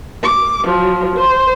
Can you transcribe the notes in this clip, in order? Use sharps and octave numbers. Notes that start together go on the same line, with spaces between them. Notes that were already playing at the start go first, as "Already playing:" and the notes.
D6
F3 F#3
C5